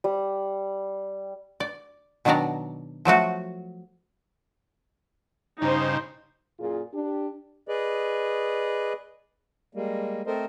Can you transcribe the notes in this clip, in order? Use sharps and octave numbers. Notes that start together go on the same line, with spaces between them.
G3
D5
B2 D#3 F#3 D4 D5 A#5
F3 F#3 A3 F#4
G2 C#3 D#4 C5
F#2 A#2 F4 G#4
D4 G4
G#4 B4 D5 D#5
G3 G#3 A#3
A3 C4 A4 A#4 C5 D#5